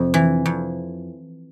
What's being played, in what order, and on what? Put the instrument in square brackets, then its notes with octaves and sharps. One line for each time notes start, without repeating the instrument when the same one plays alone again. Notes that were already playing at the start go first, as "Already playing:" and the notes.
Already playing: [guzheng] F2 C3
E3
F2